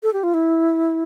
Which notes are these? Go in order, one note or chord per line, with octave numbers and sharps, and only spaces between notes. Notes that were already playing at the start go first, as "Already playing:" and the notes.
A4
G4
F4
E4